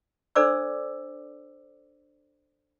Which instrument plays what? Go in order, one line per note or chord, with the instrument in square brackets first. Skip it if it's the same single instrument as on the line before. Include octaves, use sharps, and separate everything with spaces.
[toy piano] D4 A4 C5 D5 D6 E6